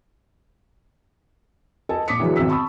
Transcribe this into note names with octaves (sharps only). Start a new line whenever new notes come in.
A4 D#5 G#5 A5
A#2 D6 D#6 B6 C#7
D3 E3 F#3 G#3 B3
G#1 B2 D5 E6 B6
A5 B5 C#6 D#6 E6